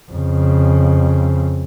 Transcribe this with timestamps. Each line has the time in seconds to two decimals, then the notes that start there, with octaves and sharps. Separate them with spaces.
0.11 F2 C#3